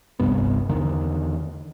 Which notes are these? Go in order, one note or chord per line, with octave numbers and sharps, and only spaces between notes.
F1 C2 G2 B3
E2 D3 D#3